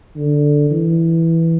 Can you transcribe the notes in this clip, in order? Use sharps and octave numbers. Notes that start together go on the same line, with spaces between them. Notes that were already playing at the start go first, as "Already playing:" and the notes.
D3
E3